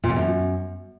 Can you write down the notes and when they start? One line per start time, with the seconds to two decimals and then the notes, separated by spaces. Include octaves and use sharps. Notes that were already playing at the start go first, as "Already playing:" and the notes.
0.04 A#2
0.10 F2
0.16 F#2